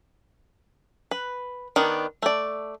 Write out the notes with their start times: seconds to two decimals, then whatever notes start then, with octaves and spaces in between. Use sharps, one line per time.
1.11 B4
1.76 D#3 B3 D4
2.22 A3 D5